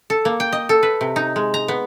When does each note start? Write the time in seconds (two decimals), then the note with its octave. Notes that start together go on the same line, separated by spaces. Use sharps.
0.10 A4
0.25 A#3
0.40 G5
0.52 D#5
0.69 A4
0.83 B4
1.01 C3
1.16 D#4
1.36 G#3
1.54 A#5
1.68 B3